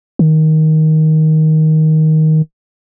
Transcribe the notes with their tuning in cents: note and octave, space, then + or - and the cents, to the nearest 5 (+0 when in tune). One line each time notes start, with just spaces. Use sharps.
D#3 +10